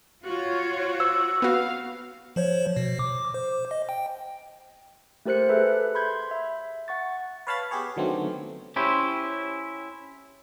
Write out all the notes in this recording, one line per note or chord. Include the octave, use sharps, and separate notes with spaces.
F4 F#4 C#5
C5 E6
B3 F#4 F5
F3 C5 C#5
B2
D6
C5
D#5
G5
A3 G4 A#4 C5 F#6 C#7
G#4 A4 B4 E5
B5 C6 G6 G#6
E5
F#5 C#6 A6
B4 C#5 F5 A5 B5 A6
B3 G4 G#4 C#5
D3 D#3 F#3 A3 B3 C4
C#4 E4 G4 C5